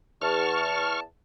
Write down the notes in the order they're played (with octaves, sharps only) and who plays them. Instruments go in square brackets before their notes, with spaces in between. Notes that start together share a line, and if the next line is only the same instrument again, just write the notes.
[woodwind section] E2 A5 [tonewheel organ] C#6 F6